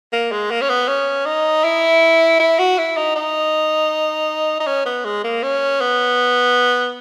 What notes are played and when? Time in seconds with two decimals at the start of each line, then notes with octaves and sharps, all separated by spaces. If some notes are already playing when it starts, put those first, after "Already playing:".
0.13 A#3
0.32 G#3
0.51 A#3
0.62 C#4
0.70 B3
0.88 C#4
1.26 D#4
1.64 E4
2.40 E4
2.59 F#4
2.78 E4
2.97 D#4
3.16 D#4
4.60 D#4
4.67 C#4
4.86 B3
5.05 G#3
5.24 A#3
5.43 C#4
5.81 B3